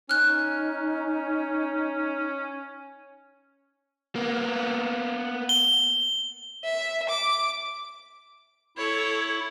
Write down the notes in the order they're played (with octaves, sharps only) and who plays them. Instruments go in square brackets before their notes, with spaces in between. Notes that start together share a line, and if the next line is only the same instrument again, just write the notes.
[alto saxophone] C#4 [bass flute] D#4 [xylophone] F6 F#6
[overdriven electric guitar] A#3 B3
[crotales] G7
[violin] E5
D6
[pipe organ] E4 [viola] A4 C#5